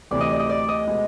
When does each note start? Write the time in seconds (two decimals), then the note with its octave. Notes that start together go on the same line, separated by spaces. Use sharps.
0.11 D2 C3 E3 D5
0.21 D#5
0.31 D5
0.40 D#5
0.49 D5
0.68 D#5
0.87 B2 G#3 B3